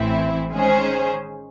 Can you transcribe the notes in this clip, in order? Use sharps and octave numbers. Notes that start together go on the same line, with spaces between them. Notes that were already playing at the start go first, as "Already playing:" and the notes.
Already playing: A1 A2 E3 C4 E4
D#3 G#3 C#4 G#4 C5